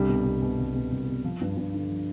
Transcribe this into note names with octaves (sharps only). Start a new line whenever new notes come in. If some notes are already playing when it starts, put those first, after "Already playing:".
Already playing: C2 D3 G3
B2
C2
B2
C2
B2
C2
B2
F3
G2
G2
D3
F3